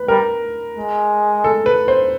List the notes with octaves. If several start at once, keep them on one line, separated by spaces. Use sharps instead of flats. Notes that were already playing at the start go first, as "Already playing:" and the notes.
Already playing: B4
G3 A#4
G#3
A4
B4
C5